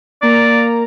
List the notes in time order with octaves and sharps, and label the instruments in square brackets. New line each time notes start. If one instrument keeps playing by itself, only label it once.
[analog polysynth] A#3 A#5 [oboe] D5